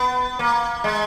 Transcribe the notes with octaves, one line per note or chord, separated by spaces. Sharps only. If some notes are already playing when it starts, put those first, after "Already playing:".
Already playing: B3
A#3
G#3